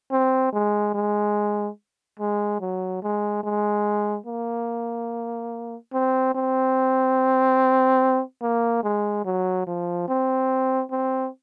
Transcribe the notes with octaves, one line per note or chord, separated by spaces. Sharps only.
C4
G#3
G#3
G#3
F#3
G#3
G#3
A#3
C4
C4
A#3
G#3
F#3
F3
C4
C4